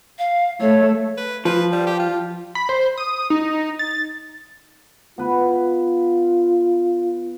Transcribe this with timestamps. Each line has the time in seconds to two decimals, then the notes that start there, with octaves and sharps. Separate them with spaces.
0.19 F5
0.61 A3 C#5
1.17 B4
1.45 F3 B4
1.72 G3
1.86 G4
1.99 F4
2.55 B5
2.69 C5
2.97 D#6
3.30 D#4
3.79 A6
5.18 B3 F4 B4